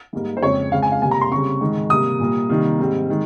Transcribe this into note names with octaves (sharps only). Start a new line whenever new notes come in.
G#2 G3 A#3
C5
F2 C#3 G#3 C4 C#5
C#3 G#3 C4 F5
G#5
F5
C3 G3 A#3 G#5
A#5
C6
C#3 G3 C4 C#6
G#2 D#3 G#3
C3 G3 A#3 D#6
A#2 G3 A#3
C3 D#3 G3 A#3
G#2 G3 C4
D#3 G#3